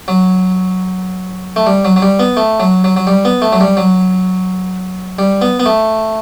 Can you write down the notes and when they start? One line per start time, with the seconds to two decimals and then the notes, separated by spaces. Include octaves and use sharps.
0.08 F#3
1.56 A3
1.66 G3
1.85 F#3
1.96 F#3
2.02 G3
2.19 B3
2.37 A3
2.60 F#3
2.84 F#3
2.97 F#3
3.07 G3
3.25 B3
3.42 A3
3.52 F#3
3.60 G3
3.77 F#3
5.19 G3
5.41 B3
5.60 B3
5.66 A3